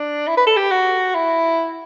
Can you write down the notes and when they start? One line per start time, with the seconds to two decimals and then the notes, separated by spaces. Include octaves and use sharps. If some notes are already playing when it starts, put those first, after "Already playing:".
Already playing: D4
0.28 E4
0.37 B4
0.47 A4
0.56 G4
0.71 F#4
1.15 E4